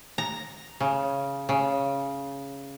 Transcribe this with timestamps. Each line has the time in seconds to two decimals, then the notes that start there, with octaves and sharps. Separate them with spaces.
0.18 A#5
0.80 C#3
1.49 C#3